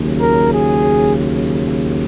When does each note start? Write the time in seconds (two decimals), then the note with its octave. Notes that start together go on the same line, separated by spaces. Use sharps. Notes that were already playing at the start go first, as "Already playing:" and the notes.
Already playing: D#2 C#3 F#3
0.20 A#4
0.53 G#4